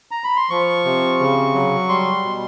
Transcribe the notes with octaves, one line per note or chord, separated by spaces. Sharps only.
A#5
B5
C6
F3 C#6
C3
C#3
F#3
G3 C6
B2